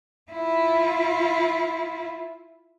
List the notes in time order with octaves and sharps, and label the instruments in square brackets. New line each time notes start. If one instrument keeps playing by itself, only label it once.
[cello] E4 F4